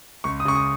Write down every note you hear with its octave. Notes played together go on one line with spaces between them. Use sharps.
C#2 C#6
D#6
C#3 C#6
D#6